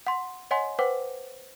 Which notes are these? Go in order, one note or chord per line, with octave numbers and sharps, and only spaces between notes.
F#5 C6
C#5 D#5 F#5 G#5 C6
B4 C5 F#5 G5 D6